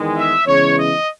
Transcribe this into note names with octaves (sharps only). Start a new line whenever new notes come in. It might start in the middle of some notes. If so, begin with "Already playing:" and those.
Already playing: E2 D#3 G#3
E5
E2 C#3 E3 G#3 C#5
D#5